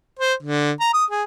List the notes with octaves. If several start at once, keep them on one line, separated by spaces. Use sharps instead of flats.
C5
D3
A#5
D#6
G#4